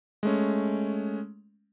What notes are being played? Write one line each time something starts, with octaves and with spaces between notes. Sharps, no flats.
G#3 A3 C#4